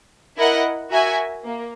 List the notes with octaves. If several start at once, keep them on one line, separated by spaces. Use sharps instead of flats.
E4 A#4 D#5 F#5
F#4 A#4 E5 G#5
A#3